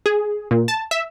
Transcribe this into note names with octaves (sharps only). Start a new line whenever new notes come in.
G#4
A#2
A5
E5